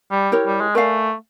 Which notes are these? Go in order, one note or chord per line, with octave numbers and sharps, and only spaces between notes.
G3
E4 G4 A#4 C#5
G3
G#3
A3 A#4 D5 F5 G#5